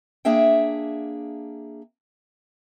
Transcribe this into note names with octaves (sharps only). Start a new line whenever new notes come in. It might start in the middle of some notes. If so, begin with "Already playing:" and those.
A#3 D4 G#4 E5 G5